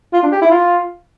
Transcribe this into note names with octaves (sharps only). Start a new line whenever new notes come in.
F4
D4
G4
E4
F4